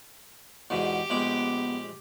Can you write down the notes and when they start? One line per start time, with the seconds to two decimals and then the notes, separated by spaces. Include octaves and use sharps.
0.70 E2 G#2 B2 G4
1.10 A#1 G#3 B3 D6